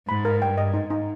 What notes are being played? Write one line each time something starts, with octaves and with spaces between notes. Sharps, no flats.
G#2 B5
A#4
G2 G5
D#5
G#2 D#4
D#4